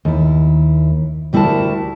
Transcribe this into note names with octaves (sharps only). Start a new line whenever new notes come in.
D#2 E4
D2 G3 E4 F#4 A#4 A5